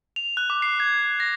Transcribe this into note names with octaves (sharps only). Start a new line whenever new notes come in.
F7
F#6
D6
C7
G#6
A#6